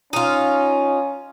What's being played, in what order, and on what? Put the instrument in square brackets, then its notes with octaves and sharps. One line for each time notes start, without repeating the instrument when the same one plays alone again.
[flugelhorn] C#4 [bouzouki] D#4 F4